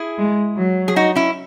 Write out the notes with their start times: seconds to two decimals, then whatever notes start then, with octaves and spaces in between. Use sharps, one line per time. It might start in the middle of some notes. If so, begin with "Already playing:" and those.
Already playing: E4 G#4
0.18 G#3
0.57 F#3
0.88 G#4
0.96 D#4 F#4
1.15 C#4 E4